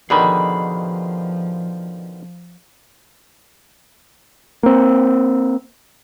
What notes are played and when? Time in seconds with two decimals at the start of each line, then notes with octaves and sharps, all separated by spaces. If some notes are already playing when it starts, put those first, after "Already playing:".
0.10 B2 D3 D#3 F3 G#4 B5
4.63 A#3 C4